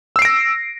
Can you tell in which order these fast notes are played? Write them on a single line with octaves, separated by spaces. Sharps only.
E6 C7 D7 A#6